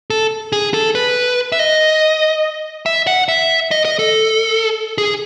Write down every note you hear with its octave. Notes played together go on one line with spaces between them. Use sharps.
A4
G#4
A4
B4
E5
D#5
E5
F#5
E5
D#5
D#5
A4
G#4